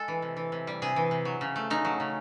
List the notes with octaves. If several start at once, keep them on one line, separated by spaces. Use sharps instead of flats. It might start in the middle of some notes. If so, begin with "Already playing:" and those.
Already playing: G#3 A4
E3
C3
E3
C3
G3
C3 G#4
E3
C3
F#3
C#3
A3
C#3 D#4
F#3
C#3